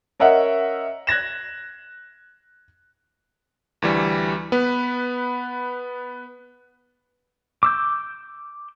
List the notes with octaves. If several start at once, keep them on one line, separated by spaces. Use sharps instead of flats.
C#4 A#4 D#5 E5 F#5
F#6 G#6 A#6 E7
D2 E3 G3
B3 B4
D6 E6 G6